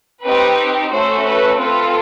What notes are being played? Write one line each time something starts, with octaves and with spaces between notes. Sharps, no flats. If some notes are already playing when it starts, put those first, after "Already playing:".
C4 D#4 G4 B4
A3 C#4 F#4 A4 C5
B4
C4 F4 A4 B4